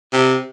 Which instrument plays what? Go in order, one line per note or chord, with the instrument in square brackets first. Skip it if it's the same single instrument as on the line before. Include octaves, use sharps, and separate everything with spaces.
[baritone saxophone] C3